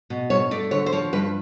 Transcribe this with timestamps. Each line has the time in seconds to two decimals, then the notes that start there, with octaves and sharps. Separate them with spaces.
0.10 B2
0.30 G2 C#5
0.51 A3 D5
0.71 D3 C#5
0.86 C5
0.92 F3 C#5
1.13 G2 B4